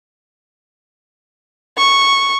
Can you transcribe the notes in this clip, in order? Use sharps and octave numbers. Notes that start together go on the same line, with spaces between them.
C#6